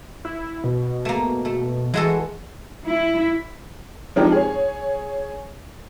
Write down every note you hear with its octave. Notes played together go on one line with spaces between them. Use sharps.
E4
B2
A3 A#3
A3
E3 G#3 F#4 A4
E4
F3 G#3 C4 D4 D#4 G4
G#4 C#5